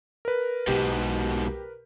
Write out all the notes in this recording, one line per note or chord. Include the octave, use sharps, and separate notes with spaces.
A#4 B4
B1 G#2 B2 G4